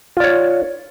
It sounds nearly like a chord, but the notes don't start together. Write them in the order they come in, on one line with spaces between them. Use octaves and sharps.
F4 D5 C#5